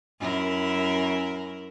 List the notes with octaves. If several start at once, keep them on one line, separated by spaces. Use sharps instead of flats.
F#2 E4 A#4